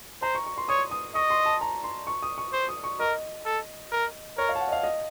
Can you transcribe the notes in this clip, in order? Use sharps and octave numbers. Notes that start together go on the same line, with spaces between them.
C5 A#5
C#6
C#6
C6
C#5 D#6
D#6
D#5 C#6
C6
A5
A#5
C6
C#6
D#6
C#6
C5
D#6
C#6
A#4 D#5
A4
A#4
A#4 C#5
F5
A5
F#5
D#5
F5
D#5